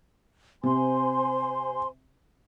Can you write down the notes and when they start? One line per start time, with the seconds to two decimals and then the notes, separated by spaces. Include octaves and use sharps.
0.63 C3 C5 G#5 C6